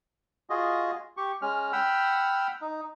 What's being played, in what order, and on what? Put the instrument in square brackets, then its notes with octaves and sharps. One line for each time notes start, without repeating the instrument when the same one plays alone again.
[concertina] F4 F#4 G#4 D#5
G4 C#6
G#3 C#4 F6
F#5 G5 B5 E6 F6
D#4